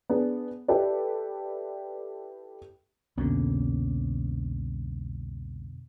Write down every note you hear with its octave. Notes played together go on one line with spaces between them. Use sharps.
B3 D4 G#4
E4 G4 A4 B4 D5
C2 F2 B2 D3 A#3 C#4